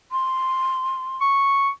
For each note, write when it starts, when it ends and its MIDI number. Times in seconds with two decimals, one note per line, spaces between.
0.12 1.18 84
1.21 1.70 85